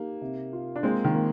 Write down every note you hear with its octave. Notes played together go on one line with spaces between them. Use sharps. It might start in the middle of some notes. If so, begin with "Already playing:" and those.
Already playing: A#3 D#4 G4
C3
F4
D4
G#3 A#3 C4
D#3
A#3